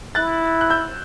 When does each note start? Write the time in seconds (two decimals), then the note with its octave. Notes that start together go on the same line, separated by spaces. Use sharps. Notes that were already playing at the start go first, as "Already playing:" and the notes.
0.15 E4 F#6 A6
0.61 F#6
0.70 E6 G6